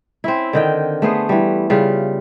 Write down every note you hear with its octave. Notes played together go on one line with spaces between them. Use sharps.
C4 C#4 E4
D3 D#3 G5
A3 B3 G#4 C5
E3 G3
C#3 G3 F4